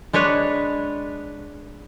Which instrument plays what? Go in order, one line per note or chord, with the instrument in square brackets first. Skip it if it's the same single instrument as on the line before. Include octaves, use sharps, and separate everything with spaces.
[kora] G#3 D4 B4 C#5